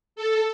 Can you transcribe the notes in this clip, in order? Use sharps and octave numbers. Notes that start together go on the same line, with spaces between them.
A4